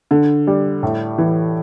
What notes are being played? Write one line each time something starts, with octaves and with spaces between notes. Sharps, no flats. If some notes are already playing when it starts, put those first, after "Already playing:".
D3
G3
A2
E3